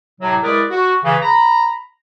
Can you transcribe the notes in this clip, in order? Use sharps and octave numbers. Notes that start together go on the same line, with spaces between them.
A2 C3 F#3
G#3 E4 G#4 A#4 B4 D5
F#4
C#3 E3
A#5 B5